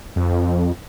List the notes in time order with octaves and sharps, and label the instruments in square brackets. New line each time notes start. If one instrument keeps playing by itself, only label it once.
[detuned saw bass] F2